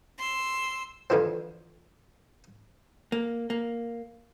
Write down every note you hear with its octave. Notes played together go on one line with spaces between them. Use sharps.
C6 E6
F2 D3 E3 F3 C4
A#3
A#3